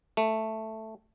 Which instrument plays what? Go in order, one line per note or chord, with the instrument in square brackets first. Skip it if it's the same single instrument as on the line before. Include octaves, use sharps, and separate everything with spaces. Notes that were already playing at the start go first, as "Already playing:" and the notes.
[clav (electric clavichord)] A3